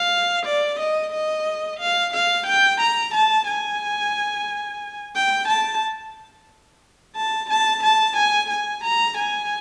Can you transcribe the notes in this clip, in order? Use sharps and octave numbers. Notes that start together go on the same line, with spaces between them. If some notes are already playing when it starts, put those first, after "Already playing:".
Already playing: F5
D5
D#5
D#5
F5
F5
G5
A#5
A5
G#5
G5
A5
A5
A5
A5
G#5
G#5
A#5
G#5